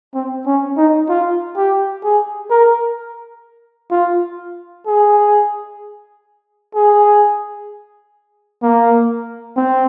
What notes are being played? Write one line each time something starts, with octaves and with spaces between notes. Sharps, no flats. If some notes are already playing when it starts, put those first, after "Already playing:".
C4
C#4
D#4
F4
G4
G#4
A#4
F4
G#4
G#4
A#3
C4